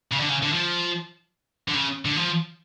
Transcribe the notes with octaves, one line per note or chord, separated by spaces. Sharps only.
C#3
D3
C#3
D3
F3
D3
C#3
D3
F3